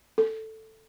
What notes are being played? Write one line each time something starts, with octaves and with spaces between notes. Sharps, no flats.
A4